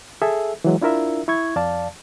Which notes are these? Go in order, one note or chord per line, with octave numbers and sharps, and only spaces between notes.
G#4 A4 E5
E3 F#3 G#3
D4 E4 F4 A#4 E5
E4 C#6 G#6
F2 D5 F5 A5